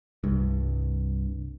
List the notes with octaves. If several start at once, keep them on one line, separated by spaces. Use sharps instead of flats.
C2 G2